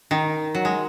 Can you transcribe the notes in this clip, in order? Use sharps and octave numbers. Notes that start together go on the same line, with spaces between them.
D#3
F#3
G#3